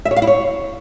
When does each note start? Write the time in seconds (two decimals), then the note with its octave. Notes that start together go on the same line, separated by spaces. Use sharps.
0.05 E5
0.11 C#5
0.16 F5
0.22 E4
0.27 C#5